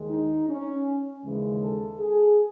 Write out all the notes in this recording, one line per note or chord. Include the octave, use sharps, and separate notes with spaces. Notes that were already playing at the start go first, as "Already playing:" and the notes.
Already playing: D#2 D#3 G#3
D#4
C#4
D#2 C#3 E3 G#3
A4
G#4